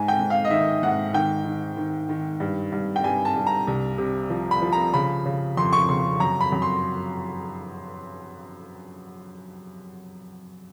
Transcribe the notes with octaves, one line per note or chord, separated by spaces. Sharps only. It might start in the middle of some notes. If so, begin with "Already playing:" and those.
Already playing: G#2 G#5
G5
G#2
F5
D#5
D#3 E5
G#2 F#5
D#3 G5
D#3
D#3
D#3
G2
G2
G5
G2 G#5
A5
G2
A#5
C2
C3
F3
B5
F3
A#5
C#3 B5
C#3
F2 C6
C#6
C#3 C6
F#2 A#5
B5
F#2
C6